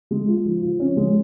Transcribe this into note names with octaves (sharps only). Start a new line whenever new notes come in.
G#3
F4
F3
F3
C#4
G#3